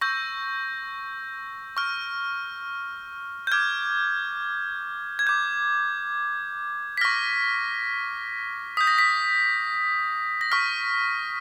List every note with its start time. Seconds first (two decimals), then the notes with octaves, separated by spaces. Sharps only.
0.01 C#6 E6 G6 A#6
1.77 C#6 F6
3.47 G6
3.52 D6 F6 G#6
5.19 G#6
5.27 D6 G6
6.98 B6
7.01 C#6 F6 A#6
8.77 D#6 G6 B6
8.87 A#6
8.98 B6
10.41 A#6
10.52 C#6 F6 B6